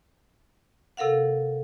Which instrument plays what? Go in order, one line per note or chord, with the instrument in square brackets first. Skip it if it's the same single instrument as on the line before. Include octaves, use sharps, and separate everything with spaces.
[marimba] C3 A4 A#4 F5 F#5